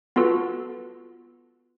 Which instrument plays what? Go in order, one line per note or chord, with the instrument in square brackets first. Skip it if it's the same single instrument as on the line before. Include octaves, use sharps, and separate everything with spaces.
[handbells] B3 F4 F#4 A4 B4